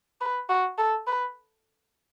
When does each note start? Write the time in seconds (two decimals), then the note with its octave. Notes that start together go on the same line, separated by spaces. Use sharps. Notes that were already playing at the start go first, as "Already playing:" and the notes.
0.21 B4
0.49 F#4
0.78 A4
1.07 B4